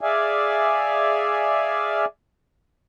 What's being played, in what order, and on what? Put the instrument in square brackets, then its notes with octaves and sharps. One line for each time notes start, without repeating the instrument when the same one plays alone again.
[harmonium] G#4 D5 E5 F5 G#5